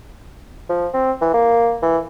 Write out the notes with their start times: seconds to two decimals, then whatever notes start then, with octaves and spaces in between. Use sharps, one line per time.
0.69 F3
0.94 C4
1.21 E3
1.34 A#3
1.82 E3